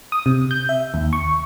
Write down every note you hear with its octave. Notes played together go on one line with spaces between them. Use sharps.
D#6
C3
G6
E5
D#2
C#6